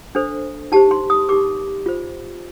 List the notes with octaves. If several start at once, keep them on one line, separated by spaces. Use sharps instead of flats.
D4 A4 C5
D#4 G4 C5 A5
C6
D#6
D#4 G4 A#4 D6
F4 C5